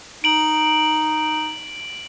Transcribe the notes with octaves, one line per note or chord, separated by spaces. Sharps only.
D#4 D7 F#7